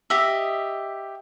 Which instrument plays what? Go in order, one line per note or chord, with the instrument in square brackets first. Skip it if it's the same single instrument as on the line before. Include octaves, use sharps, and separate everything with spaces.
[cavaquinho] G4 D#5 E5